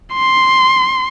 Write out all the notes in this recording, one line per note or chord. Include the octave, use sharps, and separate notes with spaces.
C6